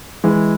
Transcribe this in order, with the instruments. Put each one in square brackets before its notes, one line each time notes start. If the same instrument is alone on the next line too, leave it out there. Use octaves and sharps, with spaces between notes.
[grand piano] E3 G#3